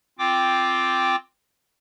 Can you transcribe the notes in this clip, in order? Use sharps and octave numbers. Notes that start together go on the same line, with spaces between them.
C4 F4 G5 D6